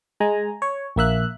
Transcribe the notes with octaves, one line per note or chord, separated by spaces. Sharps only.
G#3 G#5 A#5
C#5
A#1 A#3 E5 F#6